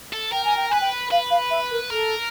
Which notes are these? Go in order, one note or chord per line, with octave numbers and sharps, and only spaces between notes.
A4
A#4 G5
G#5
G5
B4 G#5
G5
B4 F5
F5
E5
A#4
A4 A#4